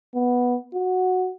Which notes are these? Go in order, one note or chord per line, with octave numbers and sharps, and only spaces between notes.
B3
F#4